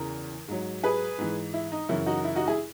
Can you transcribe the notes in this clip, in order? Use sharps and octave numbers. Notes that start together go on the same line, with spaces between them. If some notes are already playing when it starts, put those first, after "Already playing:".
Already playing: E2 C#3 E3 A#4
G#2 F#3
G#4 B4
G#2 E3
E4
D#4
F#2 C#3 E3 E4
D#4 F#4
E4
D#4 F#4
E4 G#4